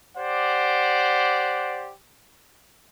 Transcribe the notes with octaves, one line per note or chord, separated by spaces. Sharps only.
G4 C5 D5 F#5